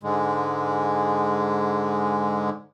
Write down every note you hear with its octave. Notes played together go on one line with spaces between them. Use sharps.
G#2 D3 G#3